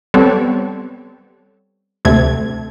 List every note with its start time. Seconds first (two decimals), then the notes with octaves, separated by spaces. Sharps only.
0.14 G3 B3 C4 A4 C#5
2.05 D2 C3 A3 G#6